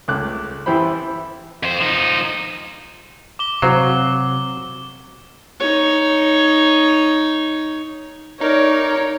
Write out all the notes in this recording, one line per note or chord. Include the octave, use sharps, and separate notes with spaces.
C#2 A3 D6 F#6
A1 E3 E4 G4 C5 B5
F2 C5
F3 D#4
D6 G7
C3 F#3 F#4 C5 F5
D#4 C#5
D#4 A#4 C#5 D5